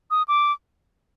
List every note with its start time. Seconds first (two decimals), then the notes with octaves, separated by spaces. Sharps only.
0.11 D#6
0.28 D6